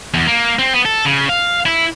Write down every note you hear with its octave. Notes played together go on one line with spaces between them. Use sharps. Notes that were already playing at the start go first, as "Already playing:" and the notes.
E2
A#3
C4
B3
A4
C#3
F5
E4